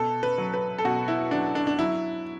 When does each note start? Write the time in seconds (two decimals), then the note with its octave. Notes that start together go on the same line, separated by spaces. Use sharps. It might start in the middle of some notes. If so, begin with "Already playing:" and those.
Already playing: B2 A4
0.23 B4
0.38 F#3
0.54 B4
0.78 A4
0.85 B2 F#4
1.08 E4
1.31 F#3 D4
1.55 D4
1.67 D4
1.79 F#3 E4